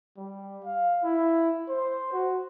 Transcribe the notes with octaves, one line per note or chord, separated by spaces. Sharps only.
G3
F5
E4
C5
F#4